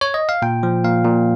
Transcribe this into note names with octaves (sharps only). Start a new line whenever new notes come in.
C#5
D#5
F5
A#2 G5
F3
A#2 F5
A#2